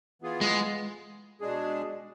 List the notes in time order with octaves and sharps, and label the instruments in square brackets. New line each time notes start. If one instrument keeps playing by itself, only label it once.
[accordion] E3 B3 F4 G#4
[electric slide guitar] G#3
[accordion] B2 G#3 D4 G#4